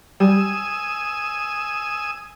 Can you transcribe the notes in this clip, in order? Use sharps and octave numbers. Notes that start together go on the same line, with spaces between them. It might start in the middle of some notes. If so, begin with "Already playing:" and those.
G3 G#5 D#6 E6